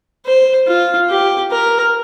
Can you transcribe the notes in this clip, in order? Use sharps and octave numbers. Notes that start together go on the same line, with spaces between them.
C5
F4
G4
A#4